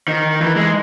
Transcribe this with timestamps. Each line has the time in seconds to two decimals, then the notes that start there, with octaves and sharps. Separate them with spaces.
0.08 D#3
0.41 E3
0.56 G#3